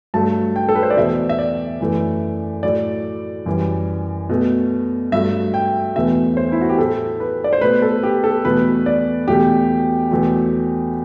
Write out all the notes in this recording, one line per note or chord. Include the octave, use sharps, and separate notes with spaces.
G2 F#3 A3 A5
G5
A4
B4
C5
D5
E2 B2 A3 E5
E5
D5
F#2 E3 A3
A2 F#3 A3 D5
F#2 E3 G3
B2 A3
G2 F#3 A3 E5
G5
E2 B2 A3 E5
C5
E4
F#4
G4
A2 F#3 A3 A4
B4
D5
C5
B2 A3 B4
A4
G4
A4
E2 B2 A3 B4
D5
E2 B2 F#3 A3 G4
E2 B2 F#3 A3